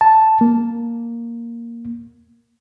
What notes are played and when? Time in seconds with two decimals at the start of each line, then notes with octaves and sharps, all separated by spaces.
0.01 A5
0.41 A#3